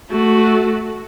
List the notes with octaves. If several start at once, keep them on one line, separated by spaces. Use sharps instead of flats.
A3 F#4